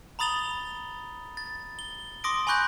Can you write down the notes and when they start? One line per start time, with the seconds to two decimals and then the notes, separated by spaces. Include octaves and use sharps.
0.19 A#5 B5 D#6 A6 F7 G7
1.37 A6
1.79 G7
2.24 C6 D6 D#6 A#6 D7
2.47 G#5 B5 C#6 F#6 G6 A#6